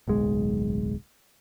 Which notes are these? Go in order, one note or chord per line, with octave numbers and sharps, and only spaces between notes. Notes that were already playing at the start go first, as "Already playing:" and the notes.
D1 B1 G#3